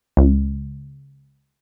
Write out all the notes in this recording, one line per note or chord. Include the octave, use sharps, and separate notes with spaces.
C#2